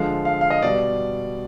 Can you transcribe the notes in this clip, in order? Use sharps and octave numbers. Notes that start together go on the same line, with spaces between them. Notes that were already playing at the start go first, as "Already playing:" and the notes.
Already playing: D3 F3 G#3 F5
F5
F5
D#5
B2 G3 D5